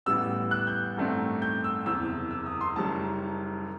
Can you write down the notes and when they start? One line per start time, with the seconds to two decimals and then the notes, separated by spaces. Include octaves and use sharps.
0.06 A1 A2 G3 B3 E6
0.51 F#6
0.67 G6
0.96 A1 G2 D#3 A3 C4
1.42 G6
1.64 E6
1.86 F#1 E2 C3 E6
2.31 E6
2.46 D#6
2.61 C6
2.76 F#1 F#2 D#3 G3 A5